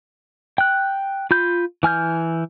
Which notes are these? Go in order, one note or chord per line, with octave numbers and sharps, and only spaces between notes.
G5 F#6
F4 B5 G6
E3 G#5 F6 G6